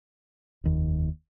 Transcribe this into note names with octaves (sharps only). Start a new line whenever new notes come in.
F1 D#2